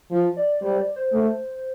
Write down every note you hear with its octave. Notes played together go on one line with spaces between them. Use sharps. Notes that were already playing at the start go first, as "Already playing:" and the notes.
F3
D5
G3 C5
D5
C5
A3